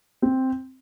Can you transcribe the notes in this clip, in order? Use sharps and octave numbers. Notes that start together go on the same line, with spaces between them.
C4